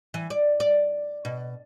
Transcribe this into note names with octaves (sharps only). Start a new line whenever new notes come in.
E3
D5
D5
B2